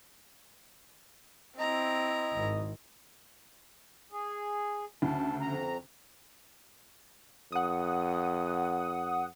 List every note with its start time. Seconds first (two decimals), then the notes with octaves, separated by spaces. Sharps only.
1.59 C4 E4 D#5 A#5
2.36 G#1
4.12 G#4
5.02 D2 C#3 A4
5.41 F2 A#5
7.52 F2 F#5 D#6